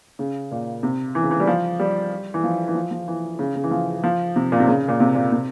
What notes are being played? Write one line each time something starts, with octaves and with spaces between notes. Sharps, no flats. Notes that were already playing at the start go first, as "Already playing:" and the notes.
C#3
A#2
C3
E3
C#3
E3
G3
F3
G3
E3
F3
E3
F3
F3
E3
C#3
C#3
E3
F3
F3
C3
A#2
C3
C#3
A#2
C3
A#2
C3